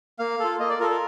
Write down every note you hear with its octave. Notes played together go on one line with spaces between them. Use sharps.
A#3 F5
F4 A4
A#3 D#5
D5
F4 A4 A#4
A#4